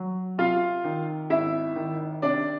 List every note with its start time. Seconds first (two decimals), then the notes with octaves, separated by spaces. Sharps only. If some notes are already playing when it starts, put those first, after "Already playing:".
Already playing: F#3
0.38 C3 F4 F5
0.84 D#3
1.30 G#1 E4 E5
1.76 D#3
2.22 C3 D4 D5